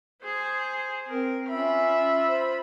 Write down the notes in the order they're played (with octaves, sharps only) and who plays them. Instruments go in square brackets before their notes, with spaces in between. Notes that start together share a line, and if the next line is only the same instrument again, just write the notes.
[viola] G#4 C5
[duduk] C4 [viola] A#4
[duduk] C#4 [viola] F4 B5 [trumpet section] E5
[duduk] C5